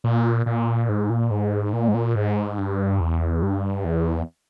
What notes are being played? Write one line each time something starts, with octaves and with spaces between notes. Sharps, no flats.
A#2
A#2
G#2
A#2
G#2
A#2
G#2
A#2
G#2
G2
E2
G2
E2